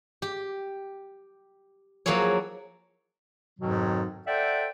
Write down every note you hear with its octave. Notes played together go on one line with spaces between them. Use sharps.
G4
F3 F#3 A#3 E4 G#4 C#5
F2 G#2 B2 D#3 F#3
A4 C5 D5 E5 F#5 G5